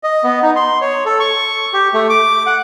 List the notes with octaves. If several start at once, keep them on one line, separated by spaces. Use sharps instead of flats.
D#5
B3
D#4
C6
C#5
A4
C#6
G4
A3
D6
F#5